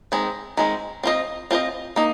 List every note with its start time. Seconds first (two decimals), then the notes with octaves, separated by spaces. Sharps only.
0.12 D#3 G#3 C4
0.57 D#3 G#3 C4
1.03 C4 F4 C5 D#5
1.51 C4 F4 C5 D#5
1.96 A#3 D#4